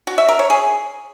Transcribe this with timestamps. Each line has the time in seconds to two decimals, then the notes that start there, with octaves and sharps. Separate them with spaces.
0.07 F#4
0.18 E5
0.29 A#4
0.39 C#5
0.50 G#4